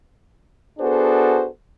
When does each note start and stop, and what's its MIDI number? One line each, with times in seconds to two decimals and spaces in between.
0.79 1.47 59
0.79 1.47 62
0.79 1.47 66
0.79 1.47 68
0.79 1.47 69
0.79 1.47 72